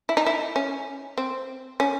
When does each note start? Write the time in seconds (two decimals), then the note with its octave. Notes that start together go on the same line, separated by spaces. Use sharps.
0.09 E4
0.17 D#4
0.26 E4
0.56 C#4
1.18 C4
1.80 C#4